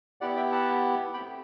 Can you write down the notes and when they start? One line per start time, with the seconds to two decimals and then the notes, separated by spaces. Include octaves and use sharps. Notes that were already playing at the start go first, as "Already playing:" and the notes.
0.21 B3 E4 G4 D5 F#5
0.36 E5 G5
0.52 F#5 A5
1.14 A3 C4 G4 G5 B5